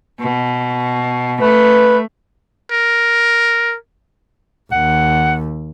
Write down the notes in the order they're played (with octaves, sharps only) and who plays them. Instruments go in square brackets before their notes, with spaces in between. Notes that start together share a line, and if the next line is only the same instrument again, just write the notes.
[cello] B2
[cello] A3 [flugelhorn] B4
[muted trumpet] A#4
[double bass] D#2 [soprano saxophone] F#5